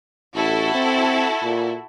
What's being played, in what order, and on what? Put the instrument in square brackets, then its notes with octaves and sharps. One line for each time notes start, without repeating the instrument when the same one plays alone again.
[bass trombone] A1 [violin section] E4 F#4 A4
[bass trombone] C4
A#2